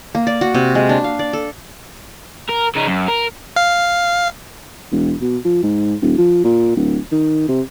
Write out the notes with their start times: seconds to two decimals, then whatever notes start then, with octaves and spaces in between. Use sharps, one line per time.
0.15 A#3
0.27 D5
0.41 F#4
0.54 C3
0.75 G#3
0.89 D4
1.04 F5
1.19 D5
1.33 A4
2.49 A#4
2.75 C#3 D#4
2.87 F#2
3.08 A#4
3.56 F5
4.91 E1
5.21 B2
5.45 F3
5.63 G#2
6.01 D#1
6.18 F3
6.44 A#2
6.76 D1
7.11 D#3
7.48 C3